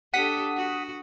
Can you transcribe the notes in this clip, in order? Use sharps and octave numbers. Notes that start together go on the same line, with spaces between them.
D4 G4 A4 F#5 D#6 B6
F#4